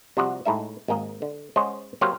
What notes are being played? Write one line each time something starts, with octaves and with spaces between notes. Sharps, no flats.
C3 F3 G3 F#4 D5 F#5
A2 G#3 D#4 E5
G#1 G#3 A#3 D#5
D3
G#3 C#4 C5 C#5 D#5 F#5
F#3 A#3 G4 C5 C#5 F5